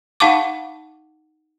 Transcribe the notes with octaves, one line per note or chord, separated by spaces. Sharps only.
D#4 F5 F#5 A5 C#6 D6